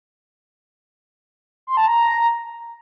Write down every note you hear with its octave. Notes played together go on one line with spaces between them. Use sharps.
C6
A5
A#5